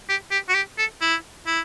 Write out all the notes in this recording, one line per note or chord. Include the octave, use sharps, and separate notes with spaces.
G4
G4
F#4
G4
A4
E4
E4